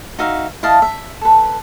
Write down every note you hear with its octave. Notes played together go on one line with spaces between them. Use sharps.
D#4 F#4 E5 F5
E4 D#5 F5 A5
E5
A4 B4